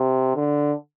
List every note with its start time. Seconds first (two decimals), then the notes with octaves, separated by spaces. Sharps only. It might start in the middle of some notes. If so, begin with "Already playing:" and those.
Already playing: C3
0.35 D3